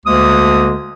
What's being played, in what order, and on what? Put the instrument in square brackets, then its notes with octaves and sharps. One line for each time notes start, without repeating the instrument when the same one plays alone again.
[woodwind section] D2 D3 G#3 A#3 D#6